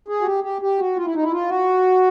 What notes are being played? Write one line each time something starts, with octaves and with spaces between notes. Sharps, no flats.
G#4
F#4
G4
G4
G4
F#4
F4
E4
D#4
E4
F4
F#4